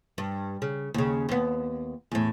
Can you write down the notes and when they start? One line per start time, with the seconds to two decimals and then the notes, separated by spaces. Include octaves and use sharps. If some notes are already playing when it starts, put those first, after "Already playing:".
0.18 G2
0.62 C#3
0.94 D#2 C#3
1.29 D#2 B3
2.11 E2 A2